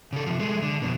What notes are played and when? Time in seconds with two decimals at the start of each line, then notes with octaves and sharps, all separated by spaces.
0.13 C#3 A4
0.26 C3 F3
0.39 G#3 A3
0.62 D3
0.82 F2 B2